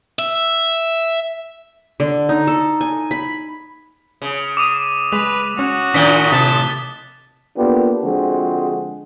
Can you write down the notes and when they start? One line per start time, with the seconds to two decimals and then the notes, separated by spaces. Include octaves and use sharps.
0.19 E5
2.00 D3
2.29 D#4
2.47 A4
2.81 G#5
3.11 B5
4.22 C#3
4.57 D6 D#6 D#7
5.12 G#3 B4 F7
5.59 C#4 F#4
5.94 A2 D#3 F3 D4 B6 G7
6.32 C3 A5 F#6 A6
7.56 A#3 B3 D4 F4 G4 A4
8.03 D3 F3 G#3 C4 F#4 G#4